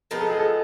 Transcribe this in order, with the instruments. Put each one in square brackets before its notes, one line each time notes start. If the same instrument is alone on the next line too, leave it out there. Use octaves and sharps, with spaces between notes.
[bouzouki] F3 G#3 B3 D#4 [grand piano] A#4
[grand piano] A4
G#4
A4